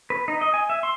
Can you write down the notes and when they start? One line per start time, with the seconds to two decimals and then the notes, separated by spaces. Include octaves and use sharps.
0.10 B4
0.28 D#4
0.41 D#5
0.54 G#5
0.70 E5
0.83 C6